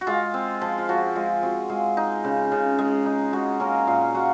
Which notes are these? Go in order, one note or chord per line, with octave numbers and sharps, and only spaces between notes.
F#4
G#3 F4
C4
F3
F4
F3 F#4
G#3 F4
C4 F#4
G#3 F4
D#4
C#3
C#3
G#3
D#4
G#3 F#4
A#3 C#4 A#4
A#2 F4 F5
F4 F#4 F#5